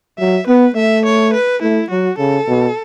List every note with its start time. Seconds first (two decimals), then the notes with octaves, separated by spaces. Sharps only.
0.19 F#3 E5
0.47 B3 B4
0.76 A3 E5
1.05 C#5
1.33 B4
1.62 A3 E4
1.90 F#3 F#4
2.18 C#3 A4
2.48 B2